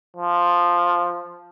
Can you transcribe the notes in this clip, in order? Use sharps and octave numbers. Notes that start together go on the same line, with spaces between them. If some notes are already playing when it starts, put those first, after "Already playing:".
F3